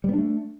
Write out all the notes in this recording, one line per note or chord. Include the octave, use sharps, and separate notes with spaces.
G3 A3 B3 D4